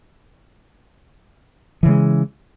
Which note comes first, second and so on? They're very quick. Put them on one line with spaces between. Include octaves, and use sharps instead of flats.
E3 C#3 G#3